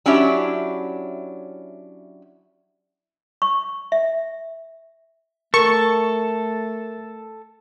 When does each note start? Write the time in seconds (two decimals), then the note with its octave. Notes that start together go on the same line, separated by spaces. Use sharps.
0.06 F#3 C#4 D4 E4 G4 E5
3.42 C#6
3.92 E5
5.54 A3 A4 A#4 C#6